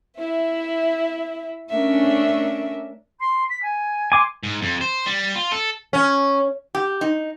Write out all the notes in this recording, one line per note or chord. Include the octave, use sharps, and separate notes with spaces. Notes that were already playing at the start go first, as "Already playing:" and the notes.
E4 E5
A3 C#4 D4 A#4 E5
C6
B6
G#5
G#5 C6 D6
G#2
F2
C5
G3
F4
A4
C#4
G4
D#4